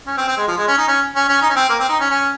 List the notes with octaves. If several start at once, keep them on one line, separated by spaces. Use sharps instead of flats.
C#4
C4
C4
G#3
F3
G#3
C#4
D#4
C#4
C#4
C#4
D#4
C#4
C4
A#3
C4
D#4
C#4
C#4